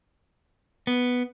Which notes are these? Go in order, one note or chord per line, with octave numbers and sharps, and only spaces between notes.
B3